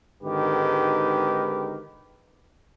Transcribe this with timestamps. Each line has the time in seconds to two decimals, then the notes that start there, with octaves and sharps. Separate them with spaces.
0.23 G#1 G#2 D3 D#3 G4 B4